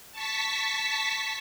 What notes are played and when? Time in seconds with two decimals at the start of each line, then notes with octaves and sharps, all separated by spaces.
0.12 A5 C#6 B6